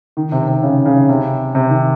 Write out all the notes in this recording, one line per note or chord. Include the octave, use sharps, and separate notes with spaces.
D#3
C3
C3
C#3
C#3
C3
C3
D#3